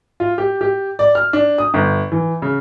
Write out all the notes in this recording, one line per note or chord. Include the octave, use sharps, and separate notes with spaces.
F4
G4
G4
D5
F6
D4
D#6
G1
E3
C#3